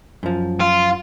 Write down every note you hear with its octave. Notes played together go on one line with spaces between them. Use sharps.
F#2 F3
F4